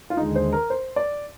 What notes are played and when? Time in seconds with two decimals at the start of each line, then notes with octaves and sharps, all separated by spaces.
0.10 F4
0.17 D#2 D3 G#3 D#4
0.36 C5
0.53 A#4
0.70 C5
0.96 D5